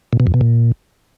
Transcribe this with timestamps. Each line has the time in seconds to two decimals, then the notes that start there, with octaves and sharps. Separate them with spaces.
0.13 A#2
0.20 B2
0.27 F2
0.34 B2
0.41 A#2